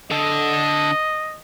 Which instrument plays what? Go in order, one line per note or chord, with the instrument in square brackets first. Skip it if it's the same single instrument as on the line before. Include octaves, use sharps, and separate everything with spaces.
[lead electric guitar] D3 A4 [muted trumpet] D#5